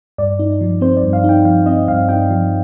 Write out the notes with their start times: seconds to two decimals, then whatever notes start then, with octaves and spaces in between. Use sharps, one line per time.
0.18 G2 D5
0.39 D#4
0.61 F3
0.81 C4 C5
0.97 D5
1.03 G2
1.13 F5
1.24 D#4 G5
1.45 F3 F5
1.66 C4 D#5
1.88 G2 F5
2.09 D#4 G5
2.30 F3